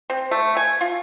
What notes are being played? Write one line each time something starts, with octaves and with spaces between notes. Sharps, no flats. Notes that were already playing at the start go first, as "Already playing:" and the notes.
C4
A3
G#5
F4